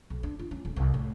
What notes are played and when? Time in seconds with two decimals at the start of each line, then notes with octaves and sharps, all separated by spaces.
0.10 B1
0.23 D4
0.39 F4
0.51 C#4
0.65 D#1
0.76 C2
0.94 A2